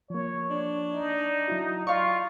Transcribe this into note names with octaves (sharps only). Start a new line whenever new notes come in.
F3 A#3 C#5
D4
D#4
F#3 E4 F#4
F4 D5 F5 C#6